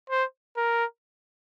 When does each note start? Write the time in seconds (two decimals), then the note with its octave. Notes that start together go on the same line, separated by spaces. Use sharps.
0.10 C5
0.57 A#4